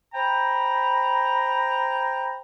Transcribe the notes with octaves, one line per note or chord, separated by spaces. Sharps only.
C5 G5 A#5 B5